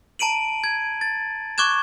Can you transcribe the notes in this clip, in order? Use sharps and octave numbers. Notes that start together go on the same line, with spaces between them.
A5 A#5 D7 D#7 F#7
G#6
A6
C#6 D6 F#6 G#6 E7